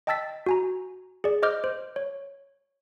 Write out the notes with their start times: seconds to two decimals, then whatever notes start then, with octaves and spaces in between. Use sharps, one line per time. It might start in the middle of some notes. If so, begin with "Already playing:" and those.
0.07 D#5 G5 A5 E6 A6 B6
0.46 F#4 G#5 A#5
1.24 G#4 D5
1.42 C5 D#5 D6 F6 G6
1.64 C5
1.96 C#5